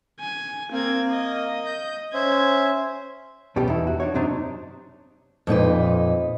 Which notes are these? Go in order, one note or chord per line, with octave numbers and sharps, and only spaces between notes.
G#5
A#3 C4 G#6
D#5
G6
C#4 C5 E5 G#6
C2 B2 G3 C#4 G4 A4
E2 D#4 E4
F#4
D4 D#4 C#5
F#2 C3 D4 D#4 C5
F2 A#2 D#4 B4